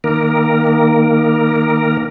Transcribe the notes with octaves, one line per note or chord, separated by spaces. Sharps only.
D#3 A#3 A#4